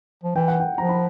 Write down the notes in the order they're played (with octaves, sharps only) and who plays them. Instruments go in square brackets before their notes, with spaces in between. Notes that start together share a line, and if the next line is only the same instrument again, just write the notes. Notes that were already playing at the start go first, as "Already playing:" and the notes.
[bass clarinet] F3
[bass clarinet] E3 [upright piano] G5
[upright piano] F#5
G5
[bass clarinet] F3 [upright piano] A#5
[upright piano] B5